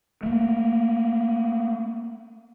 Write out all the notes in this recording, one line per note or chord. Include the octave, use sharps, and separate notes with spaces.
A3 A#3